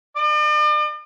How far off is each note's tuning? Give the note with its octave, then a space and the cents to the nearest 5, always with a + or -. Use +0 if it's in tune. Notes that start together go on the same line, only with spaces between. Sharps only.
D5 +45